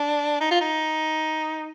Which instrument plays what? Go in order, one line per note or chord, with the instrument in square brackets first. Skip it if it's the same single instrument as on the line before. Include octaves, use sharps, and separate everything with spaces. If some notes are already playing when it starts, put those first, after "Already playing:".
Already playing: [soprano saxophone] D4
D#4
F4
D#4